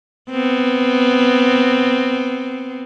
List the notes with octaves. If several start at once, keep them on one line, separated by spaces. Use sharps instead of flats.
B3 C4